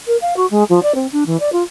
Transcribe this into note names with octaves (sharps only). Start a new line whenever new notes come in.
A#4
F5
F#4
G#3
F3
D5
C4
D4
E3
D5
F4